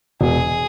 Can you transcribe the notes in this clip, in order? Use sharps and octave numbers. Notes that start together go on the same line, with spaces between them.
E1 G#4